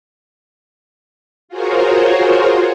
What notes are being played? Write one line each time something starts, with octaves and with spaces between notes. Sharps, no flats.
F4 F#4 G#4 A#4 C5 C#5